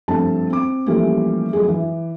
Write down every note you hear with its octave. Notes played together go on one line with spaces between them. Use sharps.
G2 F3 A3 C4 A5
C4 D6
E3 F3 G3 A3 A#3 C#4
F3 F#3 G#3 G#4
E3